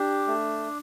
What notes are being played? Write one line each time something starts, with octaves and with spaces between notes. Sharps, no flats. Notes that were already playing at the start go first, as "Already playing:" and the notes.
Already playing: D4 G4
A3